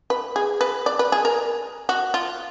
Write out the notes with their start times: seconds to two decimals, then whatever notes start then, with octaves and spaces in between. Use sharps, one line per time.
0.10 B4
0.36 G#4
0.61 B4
0.86 D5
0.99 B4
1.12 G#4
1.25 A#4
1.89 F#4
2.14 F4